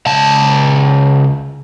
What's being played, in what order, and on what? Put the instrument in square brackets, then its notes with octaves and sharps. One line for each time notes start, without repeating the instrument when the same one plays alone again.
[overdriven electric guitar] C#2 A5